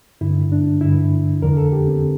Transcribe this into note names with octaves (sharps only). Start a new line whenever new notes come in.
G2 D3 E4
D4
G2 D3 E4
F2 D3 A#4
A4
G4
C4